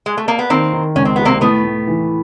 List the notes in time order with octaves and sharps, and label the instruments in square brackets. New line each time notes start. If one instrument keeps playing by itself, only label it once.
[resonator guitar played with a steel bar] G#3
A3
A#3
B3
[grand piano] D#3 [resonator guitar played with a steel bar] A#3 C4
[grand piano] D#3
[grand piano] C#2 [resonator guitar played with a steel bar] C#4
[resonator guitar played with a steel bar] C4
[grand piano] C3 [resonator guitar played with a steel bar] B3
[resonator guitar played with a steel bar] A#3 C4
[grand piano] A2 [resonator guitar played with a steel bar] A3 B3
[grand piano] A2
E3